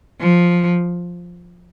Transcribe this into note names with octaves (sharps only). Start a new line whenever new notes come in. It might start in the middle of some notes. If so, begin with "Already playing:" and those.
F3